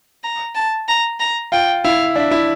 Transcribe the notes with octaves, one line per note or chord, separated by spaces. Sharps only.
A#5
A5
A#5
A#5
F4 G5
E4 F5
D4 E5
E4